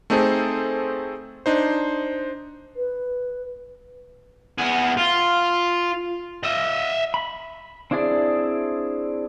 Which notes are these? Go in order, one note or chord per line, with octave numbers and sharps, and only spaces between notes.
A3 C4 D#4 G#4 A4 C5
D4 D#4 C5
B4
B3 G#4
F4
D#5 E5
B5
C4 D4 E4 G#4 D5